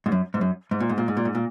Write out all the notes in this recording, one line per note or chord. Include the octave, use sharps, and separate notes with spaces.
G#2
F#2
G#2
F#2
G#2
A#2
G#2
A#2
G#2
A#2
G#2
A#2